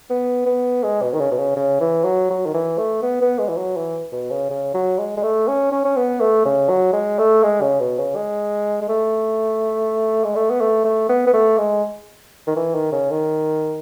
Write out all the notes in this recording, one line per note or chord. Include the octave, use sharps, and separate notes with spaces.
B3
B3
G#3
B2
D#3
C#3
B2
C#3
C#3
E3
F#3
F#3
D#3
E3
A3
B3
B3
G#3
E3
F#3
E3
B2
C#3
C#3
F#3
G#3
G#3
A3
C#4
C#4
C#4
B3
A3
C#3
F#3
G#3
A3
G#3
C#3
B2
C#3
G#3
G#3
A3
G#3
A3
B3
A3
A3
B3
B3
A3
G#3
D#3
E3
D#3
C#3
D#3